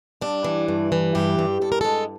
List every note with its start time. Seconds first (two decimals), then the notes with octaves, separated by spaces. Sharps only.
0.21 G2 D4
0.44 E3
0.68 G2
0.92 E3
1.15 G2 G4
1.39 G2
1.61 G2 A4
1.72 A#4
1.81 G#3 A4